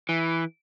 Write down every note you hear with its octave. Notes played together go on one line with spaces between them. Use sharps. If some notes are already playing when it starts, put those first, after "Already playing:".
E3